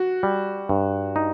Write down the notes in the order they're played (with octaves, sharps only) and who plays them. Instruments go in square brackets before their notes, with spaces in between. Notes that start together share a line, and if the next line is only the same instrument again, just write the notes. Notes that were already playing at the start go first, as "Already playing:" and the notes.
Already playing: [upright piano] F#4
[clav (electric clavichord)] G3
G2
D#4